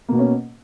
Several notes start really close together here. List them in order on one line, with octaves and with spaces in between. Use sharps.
A#3 B2 B3 C#4